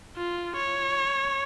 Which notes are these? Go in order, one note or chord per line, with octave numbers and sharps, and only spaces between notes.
F4
C#5